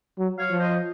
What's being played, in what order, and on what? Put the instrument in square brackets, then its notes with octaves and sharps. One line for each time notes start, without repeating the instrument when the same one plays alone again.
[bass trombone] F#3
[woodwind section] C#5 F5
[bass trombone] F3
[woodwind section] C5 D#5